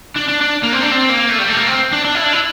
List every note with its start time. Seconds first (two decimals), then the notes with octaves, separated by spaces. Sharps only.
0.16 D4
0.28 D4
0.41 D4
0.63 A#3
0.73 C4
0.82 D4
0.91 C4
1.10 A#3
1.29 A3
1.39 G3
1.49 A3
1.57 A#3
1.67 C4
1.93 D4
2.05 D4
2.15 E4
2.24 D4
2.33 E4